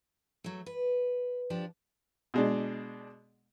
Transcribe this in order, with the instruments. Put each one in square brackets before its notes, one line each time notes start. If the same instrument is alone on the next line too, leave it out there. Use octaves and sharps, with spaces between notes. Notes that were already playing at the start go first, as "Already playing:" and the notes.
[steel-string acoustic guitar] F#3 A3
B4
F3 D4 G4
[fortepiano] B2 G#3 D4